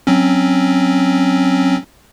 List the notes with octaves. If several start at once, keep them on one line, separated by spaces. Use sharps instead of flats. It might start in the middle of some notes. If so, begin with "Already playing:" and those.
F#3 C4 C#4